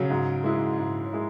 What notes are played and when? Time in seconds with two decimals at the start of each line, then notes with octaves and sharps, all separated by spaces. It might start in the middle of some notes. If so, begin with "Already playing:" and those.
Already playing: C#3 F#3
0.10 G#2
0.44 G#3 E4
0.78 G#2
1.13 G#3 E4